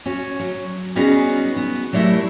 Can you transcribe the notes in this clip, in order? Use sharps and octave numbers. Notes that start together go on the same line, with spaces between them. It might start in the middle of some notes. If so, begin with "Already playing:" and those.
C#4 F#4
F#3
G3 B3 C#4 D#4 F#4 G#4
B3
F#3 G3 A3 E4 A#4